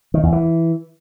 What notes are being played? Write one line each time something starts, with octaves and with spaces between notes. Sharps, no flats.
D#3
E2
E3